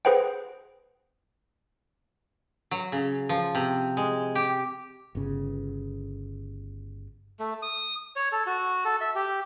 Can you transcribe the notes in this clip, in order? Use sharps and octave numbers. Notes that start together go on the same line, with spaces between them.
G#4 B4 C5 F#5 G5
F#3
C#3
F3
C3
G#3
G4
G1 C#3
A3
D#6
C#5
A4
F#4
A4
E5
G4